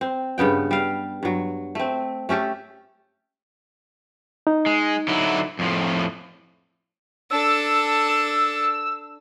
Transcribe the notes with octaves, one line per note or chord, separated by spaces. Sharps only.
C4
G2 C#3 B3 G5
G3 F5
G2 F#3
A3 C4
A3 C#4 G4 A4
D#4
G#3
D3 F#3 E4
F2 A2 F3
D4 A4 E6